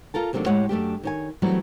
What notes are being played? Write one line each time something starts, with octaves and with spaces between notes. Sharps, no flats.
F4 A4 A#4 A5
D#2 C3 F#3 G#3 A3 D4
A2 G#3 G4 C#5 F#5
F#2 A3 D4 G4
D#3 C#5 G#5
E3 F#3 G3 A3 C4